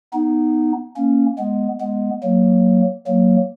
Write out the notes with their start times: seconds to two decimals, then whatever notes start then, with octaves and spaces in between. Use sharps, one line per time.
0.13 B3 D#4
0.96 A#3 C#4
1.38 G#3 B3
1.80 G#3 B3
2.22 F#3 A#3
3.07 F#3 A#3